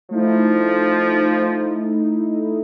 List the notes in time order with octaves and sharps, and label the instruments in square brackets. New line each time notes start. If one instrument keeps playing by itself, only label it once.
[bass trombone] F3 [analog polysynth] A3 D#4 E4